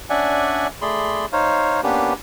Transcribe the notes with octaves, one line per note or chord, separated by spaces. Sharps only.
C#4 D4 D5 E5 F#5 G#5
A3 G#4 D5 B5 C6
D#4 C5 C#5 F5
A#3 B3 C#4 D4 G4 B4